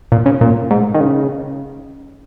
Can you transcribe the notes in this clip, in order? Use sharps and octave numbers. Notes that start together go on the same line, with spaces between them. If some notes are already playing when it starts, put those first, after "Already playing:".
A#2
C#3
A#2
G#2
D#3
C#3